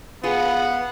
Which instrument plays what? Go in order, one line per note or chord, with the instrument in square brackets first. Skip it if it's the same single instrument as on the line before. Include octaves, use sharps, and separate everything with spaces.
[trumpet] B3 [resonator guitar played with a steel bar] F4 G#4